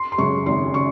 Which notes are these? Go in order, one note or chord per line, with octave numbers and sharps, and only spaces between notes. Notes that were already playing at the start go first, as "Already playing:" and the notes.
Already playing: C6
C6
F#2 C#3 G#3 C#6
G#1 C6
C#3 C#6